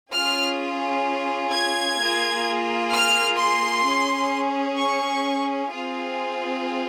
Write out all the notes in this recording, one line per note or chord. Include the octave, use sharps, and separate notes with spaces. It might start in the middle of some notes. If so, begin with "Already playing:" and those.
C#4 F4 G#4 F6
G#6
A#3 F4 G#4
F6
C6
C#4 G#4
C#6
C4 F4 G#4